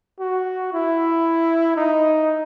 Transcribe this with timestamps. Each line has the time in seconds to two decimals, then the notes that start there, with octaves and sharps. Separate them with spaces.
0.20 F#4
0.73 E4
1.76 D#4